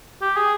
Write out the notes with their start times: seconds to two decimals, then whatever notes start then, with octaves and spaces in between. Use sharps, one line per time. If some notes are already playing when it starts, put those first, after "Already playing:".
0.22 G4
0.37 G#4